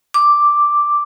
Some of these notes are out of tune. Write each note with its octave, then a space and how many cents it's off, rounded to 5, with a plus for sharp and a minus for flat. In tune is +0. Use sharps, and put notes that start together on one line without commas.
D6 +0